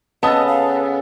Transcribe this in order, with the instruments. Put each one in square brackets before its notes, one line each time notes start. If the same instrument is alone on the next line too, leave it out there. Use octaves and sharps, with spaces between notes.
[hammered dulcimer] C#3 A4 [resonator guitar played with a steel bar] B3 [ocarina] D#5 [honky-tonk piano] A5 D#6
[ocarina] F5